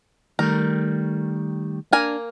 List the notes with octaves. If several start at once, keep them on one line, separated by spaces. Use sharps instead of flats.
D#3 G3 A3 A#4
A#3 D4 A#4 G#5